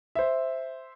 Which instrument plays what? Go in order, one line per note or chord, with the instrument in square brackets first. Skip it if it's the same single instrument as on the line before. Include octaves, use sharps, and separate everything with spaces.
[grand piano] C5 E5